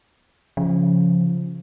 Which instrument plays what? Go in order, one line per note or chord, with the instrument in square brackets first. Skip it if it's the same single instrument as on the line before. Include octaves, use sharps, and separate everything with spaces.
[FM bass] C#3 [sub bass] F3